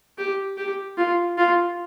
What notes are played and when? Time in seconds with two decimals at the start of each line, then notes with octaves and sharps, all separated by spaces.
0.18 G4
0.57 G4
0.97 F4
1.37 F4